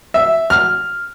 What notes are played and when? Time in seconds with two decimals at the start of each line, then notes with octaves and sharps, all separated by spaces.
0.14 E5
0.50 F6